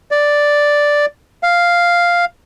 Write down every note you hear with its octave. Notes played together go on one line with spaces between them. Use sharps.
D5
F5